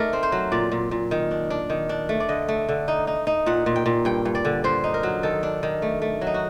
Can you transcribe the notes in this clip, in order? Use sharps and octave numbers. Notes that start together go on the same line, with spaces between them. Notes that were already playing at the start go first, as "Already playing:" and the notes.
Already playing: A3 D#4 A#4 D5
C4
C5
F#3
A#2 D5
A#2
A#2
D#3
D4
D4
D#3
D4
A3
D5
D3 D#5
A3
D3
D#4
D#4
D#4
A#2 F#5
A#2
G5
A#2
G2 G5
G2
D5
D3
D3 C5
D#4
A#4
F#3
D#3 A4
D4
D#3
A3
A3
F#3
D#4
F#4